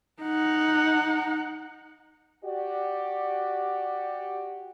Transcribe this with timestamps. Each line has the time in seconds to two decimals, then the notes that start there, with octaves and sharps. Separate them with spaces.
0.23 D#4 F#5
2.43 F#4 G4 D5